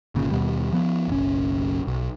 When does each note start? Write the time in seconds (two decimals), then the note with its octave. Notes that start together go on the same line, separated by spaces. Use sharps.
0.15 G1 A#2 C#3
0.31 D#2 B2 G3
0.72 F3 B3
1.08 F#1 B1 C#4
1.87 B1